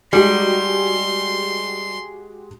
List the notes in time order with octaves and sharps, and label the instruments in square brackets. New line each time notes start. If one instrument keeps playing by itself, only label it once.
[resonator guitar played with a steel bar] G3 D#4 [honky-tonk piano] G#3 F#4 G4 [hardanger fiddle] C6